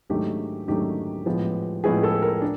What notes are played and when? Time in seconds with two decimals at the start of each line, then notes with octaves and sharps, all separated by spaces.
0.10 G#2 D#3 F#3 A3 D4 G4
0.68 G#2 D#3 F#3 A3 D4 G4
1.26 A2 F3 G#3 B3
1.84 A2 F3 G#3 B3 G#4
2.03 A4
2.22 A#4
2.42 D4